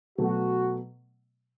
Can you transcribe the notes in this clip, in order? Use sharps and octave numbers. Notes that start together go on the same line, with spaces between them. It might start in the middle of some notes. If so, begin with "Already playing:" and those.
B2 F#3 A3 F#4